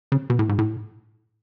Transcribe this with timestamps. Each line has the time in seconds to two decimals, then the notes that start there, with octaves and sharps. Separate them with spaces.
0.12 C#3
0.30 B2
0.39 A2
0.49 G#2
0.58 A2